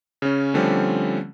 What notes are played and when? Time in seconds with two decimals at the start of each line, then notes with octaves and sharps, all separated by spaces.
0.22 C#3 C#4
0.54 D3 F3 G3 A3 C4 C#4